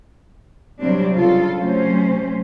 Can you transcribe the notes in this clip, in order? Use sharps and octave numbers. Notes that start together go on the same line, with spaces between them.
C3 F#3 G3 C4 D4
C#3 F4 A4
C3 F#3 A3 C#4 C5